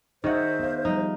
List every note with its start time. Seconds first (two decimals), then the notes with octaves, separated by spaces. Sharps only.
0.24 D#3 F#4 G#4 C5 D#5 E5 F#5
0.59 B3 F5
0.85 F3 G3 D#4